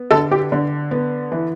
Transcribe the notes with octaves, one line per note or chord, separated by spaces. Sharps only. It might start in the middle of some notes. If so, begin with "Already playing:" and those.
Already playing: B3
D3 A4
G4
D3
B3
E3